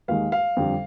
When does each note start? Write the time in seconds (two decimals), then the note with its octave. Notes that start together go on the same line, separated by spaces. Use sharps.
0.08 D#2 D#3 G#3 F5
0.32 F5
0.56 F2 D3 G3